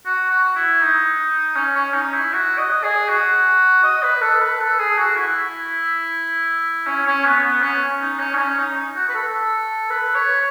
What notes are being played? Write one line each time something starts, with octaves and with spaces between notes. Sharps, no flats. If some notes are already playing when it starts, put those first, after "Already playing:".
F#4
F#4
E4
D#4
C#4
C#4
D#4
E4
F#4
D#5
G#4
F#4
D#5
B4
A4
B4
A4
G#4
F#4
E4
C#4
C#4
B3
B3
C#4
D#4
C#4
D#4
C#4
D#4
F#4
B4
A4
B4
C#5